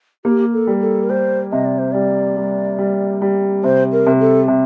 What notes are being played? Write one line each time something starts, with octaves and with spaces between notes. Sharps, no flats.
A#3 G4
A4
G3
A4
A#4
G3 C5
C3 D#5
D5
C5
G3 D5
G3
G3
G3
C3 C5
A#4
C3
A4
C3